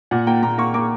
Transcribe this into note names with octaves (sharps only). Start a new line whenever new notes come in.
A#2 F#5
A#3 G5
A#2 A#5
A#3 C#6
A#3 D6